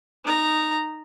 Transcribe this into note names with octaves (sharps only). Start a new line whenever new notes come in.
D#4 A#5